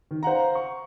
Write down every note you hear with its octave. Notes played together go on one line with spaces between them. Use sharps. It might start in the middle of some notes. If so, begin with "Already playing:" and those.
D#3
C5 F5 F#5 A#5
C#6